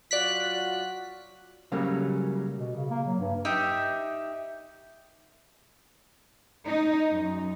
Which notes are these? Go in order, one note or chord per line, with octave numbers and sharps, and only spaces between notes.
F#3 F4 F#4 D5 F#6 B6
C#3 F#3 G3 A3 A#3 C#4
B2
C#3
A#3
F#3
G2
D#4 G4 E5
D#4
F#2